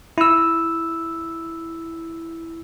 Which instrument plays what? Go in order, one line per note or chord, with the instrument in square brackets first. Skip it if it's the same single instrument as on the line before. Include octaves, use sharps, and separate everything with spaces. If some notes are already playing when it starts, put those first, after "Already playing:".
[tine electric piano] E4 E6